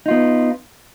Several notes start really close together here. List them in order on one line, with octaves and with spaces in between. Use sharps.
D#4 F4 B3